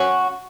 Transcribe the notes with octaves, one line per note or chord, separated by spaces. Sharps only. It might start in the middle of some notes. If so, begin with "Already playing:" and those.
Already playing: F#3 C#4 F#4